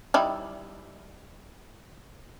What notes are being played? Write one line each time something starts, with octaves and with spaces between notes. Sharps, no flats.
G3 D#4 E4